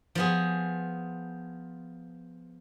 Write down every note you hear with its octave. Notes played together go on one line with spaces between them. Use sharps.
F3 B3 G#4